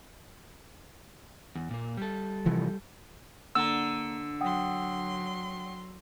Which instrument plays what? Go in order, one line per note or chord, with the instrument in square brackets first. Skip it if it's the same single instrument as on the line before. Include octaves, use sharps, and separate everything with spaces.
[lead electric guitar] E2
A#2 A#3
G3 A4
[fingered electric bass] C3 E3 F3
[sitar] D3 [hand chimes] A#3 A#5 [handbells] E6
[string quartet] F#3 C6 [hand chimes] F#5 G5 D#6